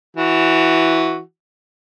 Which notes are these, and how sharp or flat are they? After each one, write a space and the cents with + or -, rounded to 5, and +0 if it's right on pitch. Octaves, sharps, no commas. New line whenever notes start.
E3 -5 F#4 +0